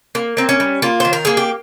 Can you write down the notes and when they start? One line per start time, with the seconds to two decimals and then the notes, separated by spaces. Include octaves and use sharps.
0.15 A#3
0.37 A#3 C4
0.49 C#4
0.60 G3
0.82 A#3 F4
1.00 D#3 C5
1.13 A#4
1.25 A#3 G#4
1.37 G4